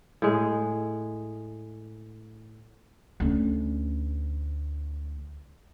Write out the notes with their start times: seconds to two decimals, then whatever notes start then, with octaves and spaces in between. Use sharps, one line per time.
0.22 A2 G#3
3.20 D2 C#4